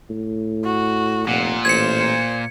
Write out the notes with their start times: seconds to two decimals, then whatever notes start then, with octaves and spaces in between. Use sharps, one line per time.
0.10 A2
0.65 F#4
1.28 F1 A#2 F#5
1.65 A1 C5 G#6 C#7